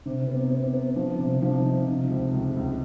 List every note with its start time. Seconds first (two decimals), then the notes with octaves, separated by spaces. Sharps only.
0.06 C3
0.27 B3
0.51 B3
0.74 B3
0.96 F3
1.18 C3
1.42 F3
1.65 D#4
1.87 C3
2.10 C#2
2.33 C#2
2.56 C#2